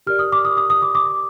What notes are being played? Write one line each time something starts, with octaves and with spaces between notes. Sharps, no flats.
G4 A#4 D5 F6
D#6
D6
D#6
D#6
D#6
D6
D6